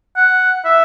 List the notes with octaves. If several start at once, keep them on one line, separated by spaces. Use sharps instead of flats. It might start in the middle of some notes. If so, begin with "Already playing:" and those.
F#5
E5